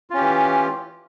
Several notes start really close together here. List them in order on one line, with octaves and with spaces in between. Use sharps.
F4 C#4 G4 E3